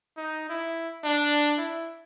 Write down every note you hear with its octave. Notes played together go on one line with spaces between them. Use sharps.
D#4
E4
D4
E4